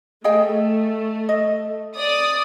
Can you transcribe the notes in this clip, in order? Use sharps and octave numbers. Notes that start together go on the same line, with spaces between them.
A3 G#4 D#5 G5
D#5
D5 D#6